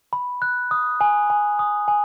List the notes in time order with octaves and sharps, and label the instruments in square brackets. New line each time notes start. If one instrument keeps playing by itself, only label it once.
[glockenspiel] B5
F#6
D#6
G#5
G#5
D#6
G#5